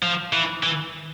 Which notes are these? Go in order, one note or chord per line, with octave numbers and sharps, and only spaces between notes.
F3
E3
E3